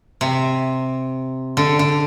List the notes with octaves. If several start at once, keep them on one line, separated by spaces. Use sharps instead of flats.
C3
D3
D3